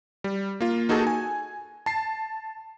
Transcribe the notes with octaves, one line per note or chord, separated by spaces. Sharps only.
G3
A#3 F4
A#3 D#4 F#4 G#4 A4 A5
G#5
A5 C7